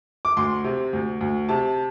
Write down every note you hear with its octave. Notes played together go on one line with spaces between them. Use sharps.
D6
D2 C6
C3
D2
D2
C3 A5